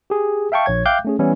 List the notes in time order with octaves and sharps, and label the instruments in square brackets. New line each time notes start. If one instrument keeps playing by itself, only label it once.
[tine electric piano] G4 G#4
E5 F5 G5 A5 C#6
A#1 C#5 G#6
E5 F5 G5 D6 F#6 G6
A3 C#4 G#4
E3 G3 B3 C#4 E4